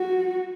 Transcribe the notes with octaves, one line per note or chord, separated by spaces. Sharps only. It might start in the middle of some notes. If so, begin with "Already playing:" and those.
Already playing: F#4